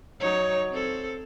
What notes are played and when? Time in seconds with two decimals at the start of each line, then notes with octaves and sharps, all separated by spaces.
0.20 F#3 D#4 C#5
0.72 C4 A4